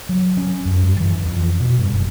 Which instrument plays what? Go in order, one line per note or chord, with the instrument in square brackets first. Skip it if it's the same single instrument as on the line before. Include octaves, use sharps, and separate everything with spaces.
[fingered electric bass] F#3
C#4
F#2
G2
E3
F2
B2
G2
F#1